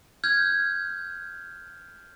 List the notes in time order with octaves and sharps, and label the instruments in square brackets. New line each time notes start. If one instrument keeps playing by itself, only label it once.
[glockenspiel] F6 G6 G#6